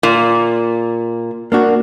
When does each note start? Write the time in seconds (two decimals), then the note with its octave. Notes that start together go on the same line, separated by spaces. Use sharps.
0.03 A#2
1.52 A#3 D4 F#4